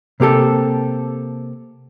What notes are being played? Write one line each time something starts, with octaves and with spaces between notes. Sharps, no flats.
C3 A#3 G4 A4